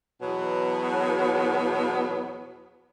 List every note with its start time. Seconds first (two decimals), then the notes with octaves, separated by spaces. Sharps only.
0.21 E2 B2 F#3 B3